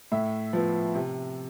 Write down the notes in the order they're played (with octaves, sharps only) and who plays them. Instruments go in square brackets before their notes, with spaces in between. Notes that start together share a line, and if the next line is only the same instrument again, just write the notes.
[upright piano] A2 E5
F3 B3
C3